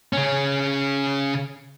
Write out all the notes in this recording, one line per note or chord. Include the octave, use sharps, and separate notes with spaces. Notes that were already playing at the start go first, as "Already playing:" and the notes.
C#3 C#4